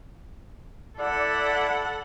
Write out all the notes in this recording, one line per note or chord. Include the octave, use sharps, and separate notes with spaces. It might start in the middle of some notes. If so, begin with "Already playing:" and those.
E4 A4 D5 F#5